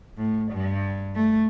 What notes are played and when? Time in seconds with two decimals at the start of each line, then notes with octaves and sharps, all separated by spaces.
0.17 A2
0.52 G2
1.15 A3